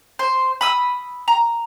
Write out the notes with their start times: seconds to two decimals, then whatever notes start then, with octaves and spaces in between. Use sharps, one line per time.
0.19 C5
0.61 B5 D#6 E6
1.28 A#5